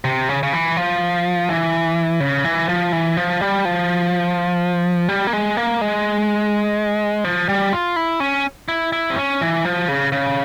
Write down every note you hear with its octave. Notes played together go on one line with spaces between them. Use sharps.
C3
C#3
C#3
E3
F3
E3
C#3
E3
F3
E3
F3
G3
F3
G3
A#3
G#3
A#3
G#3
F3
G3
F4
E4
C#4
E4
E4
C4
C#4
E3
F3
C#3
C#3